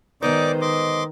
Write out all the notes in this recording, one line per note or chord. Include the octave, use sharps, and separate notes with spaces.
D#3 G#3 B3 D#4 C5 D5 D6
D#5 C6 D6